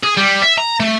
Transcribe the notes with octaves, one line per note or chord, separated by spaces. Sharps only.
G#4
G3
E5
A#5
A3